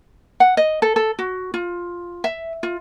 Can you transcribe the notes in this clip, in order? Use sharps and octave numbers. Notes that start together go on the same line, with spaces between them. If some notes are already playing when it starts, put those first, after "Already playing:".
F#5
D#5
A4
A4
F#4
F4
E5
F4